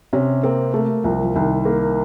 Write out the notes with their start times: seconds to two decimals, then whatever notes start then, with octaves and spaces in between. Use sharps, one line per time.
0.13 C3 C#4
0.43 A#3 C4
0.73 A3 A#3
1.04 C2 F3
1.23 F3
1.36 C2 D#3
1.65 A#3